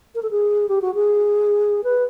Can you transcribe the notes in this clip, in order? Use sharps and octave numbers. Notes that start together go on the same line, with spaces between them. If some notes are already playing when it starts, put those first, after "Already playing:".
A#4
A4
G#4
G4
F#4
G#4
B4